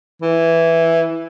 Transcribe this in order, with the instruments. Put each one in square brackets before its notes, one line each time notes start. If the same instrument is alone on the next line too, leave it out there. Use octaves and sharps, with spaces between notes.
[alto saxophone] E3